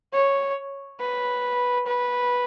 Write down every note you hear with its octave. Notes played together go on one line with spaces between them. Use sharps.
C#5
B4
B4